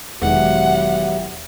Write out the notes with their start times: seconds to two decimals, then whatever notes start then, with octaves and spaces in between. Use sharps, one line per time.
0.22 E1 D#3 F#3 G#3 B3 E4 G4 F#5